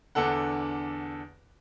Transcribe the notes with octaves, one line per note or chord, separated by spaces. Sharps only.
E2 D3 D4 A4 F#5